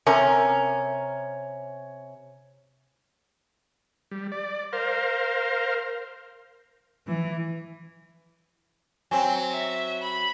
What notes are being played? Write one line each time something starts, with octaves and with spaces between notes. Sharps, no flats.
C3 C#4 A#4
G3
D5
A#4 C5 F5
E3
F#3 C4 G#5
E5
B5